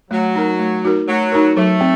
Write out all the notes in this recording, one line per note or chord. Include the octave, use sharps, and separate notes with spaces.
F#3 A3
D#4 F#4 A#4
A3
D#4 F#4 A#4
F#3 A3
D#4 F#4 A#4
F#3 A3
C4